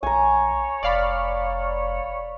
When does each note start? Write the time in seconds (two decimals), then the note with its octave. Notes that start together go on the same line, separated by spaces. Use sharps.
0.03 A#1 C#5 G#5 A#5
0.83 F1 D5 F5 B5